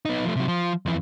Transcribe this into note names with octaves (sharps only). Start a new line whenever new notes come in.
B3 D#4
F3 A3
C3 F#3
F3
F2 E3